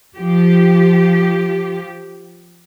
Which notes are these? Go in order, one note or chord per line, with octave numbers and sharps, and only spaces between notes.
F3 G4